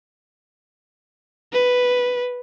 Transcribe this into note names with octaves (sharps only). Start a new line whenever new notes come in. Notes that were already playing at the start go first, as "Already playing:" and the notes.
B4